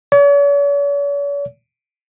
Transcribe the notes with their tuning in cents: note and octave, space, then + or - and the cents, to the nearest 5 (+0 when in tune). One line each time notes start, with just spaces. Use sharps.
C#5 +45